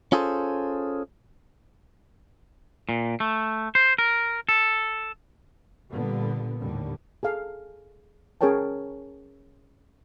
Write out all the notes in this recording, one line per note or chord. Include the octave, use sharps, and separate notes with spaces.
C#4 F4 G#4 A4 C5
A#2
A3
C5
A#4
A4
A#2 D3 G3 B3
D#2 A2 D3 G3
G#4 A4 F5
C#4 G#4 A#4 C#5 G5 A5